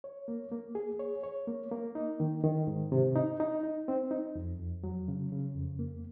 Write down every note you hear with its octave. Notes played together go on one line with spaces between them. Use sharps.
C#5
A#3
A#3
G#4
C#5
C#5
A#3
A#3
D#4
D#3
D#3
G#2
C3
D#4
D#4
D#4
C4
D#4
F2
F2
F#3
C#3
C#3
F2
A#3